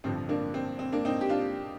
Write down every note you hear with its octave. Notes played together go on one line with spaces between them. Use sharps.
A1 G2 D3 F3 C4
A#3 D4
C4
C4
A#3 D4
C4 D#4
G4
D4 F4